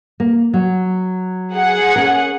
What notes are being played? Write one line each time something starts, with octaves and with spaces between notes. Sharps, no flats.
A#3
F#3
G#4 F#5
C#4 A#4